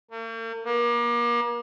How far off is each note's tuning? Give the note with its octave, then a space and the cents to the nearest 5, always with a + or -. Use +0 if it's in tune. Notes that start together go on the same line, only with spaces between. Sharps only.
A#3 -45
A#3 +35